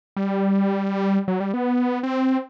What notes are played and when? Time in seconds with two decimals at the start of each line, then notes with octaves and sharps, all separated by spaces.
0.17 G3
1.28 F#3
1.40 G3
1.54 B3
2.03 C4